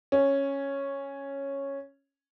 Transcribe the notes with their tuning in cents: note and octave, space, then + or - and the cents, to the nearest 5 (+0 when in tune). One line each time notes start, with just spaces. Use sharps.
C#4 -5